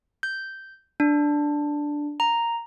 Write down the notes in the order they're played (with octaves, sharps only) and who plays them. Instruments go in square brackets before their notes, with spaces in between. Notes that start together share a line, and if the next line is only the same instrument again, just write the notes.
[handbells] G6
D4
A#5